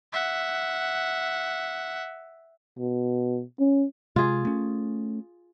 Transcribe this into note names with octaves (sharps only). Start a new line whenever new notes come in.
E5 F#5
B2
C#4
C3 G#3 F4 G#4
A3 C#4